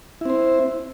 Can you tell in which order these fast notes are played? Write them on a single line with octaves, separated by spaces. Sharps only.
E4 C4 C5